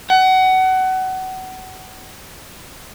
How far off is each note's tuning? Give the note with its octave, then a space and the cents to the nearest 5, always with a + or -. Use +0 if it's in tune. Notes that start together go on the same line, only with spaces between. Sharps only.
F#5 +25